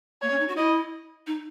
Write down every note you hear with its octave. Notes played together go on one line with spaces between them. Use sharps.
A#3 C#5
C#4
D#4
F#4
E4 D#5
D#4